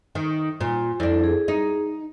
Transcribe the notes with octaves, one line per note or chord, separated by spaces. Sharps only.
D#3
A#2
F2 D4 E4
G#4
D#4